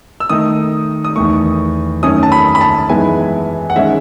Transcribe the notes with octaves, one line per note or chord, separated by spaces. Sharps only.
E6
D#3 A3 D#4 D#6
D#6
E2 D#3 A3 C#6
F#2 D#3 A3 C#4 D#6
A5
B5
B5
A5
F#2 E3 G#3 B3 D#4 G#5
F#5
D#3 G#3 C#4 E5